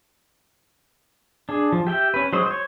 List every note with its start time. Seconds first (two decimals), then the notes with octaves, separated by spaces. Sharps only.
1.49 D4 G#4
1.72 F3
1.87 G4 E5 G5
2.14 C#4 B4
2.33 F#3 G#3 C5 D#5
2.46 C5 C#5